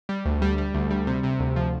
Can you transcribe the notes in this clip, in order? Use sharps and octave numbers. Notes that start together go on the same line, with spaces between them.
G3
D2
G3
G3
D2
G3
C3
C3
D2
F3